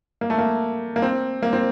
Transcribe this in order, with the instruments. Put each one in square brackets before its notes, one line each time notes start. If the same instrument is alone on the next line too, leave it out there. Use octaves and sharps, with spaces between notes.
[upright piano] A#3
A3
A#3
A#3
C4
A#3
C4